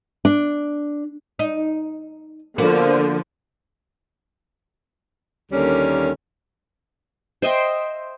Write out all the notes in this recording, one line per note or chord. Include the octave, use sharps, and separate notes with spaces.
D4
D#4
D3 F3 A#3 B3 F#4
D#2 D3 G3 A#3 C#4
C5 D#5 E5 G5